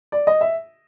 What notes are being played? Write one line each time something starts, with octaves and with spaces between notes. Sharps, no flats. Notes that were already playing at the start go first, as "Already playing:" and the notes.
D5
D#5
E5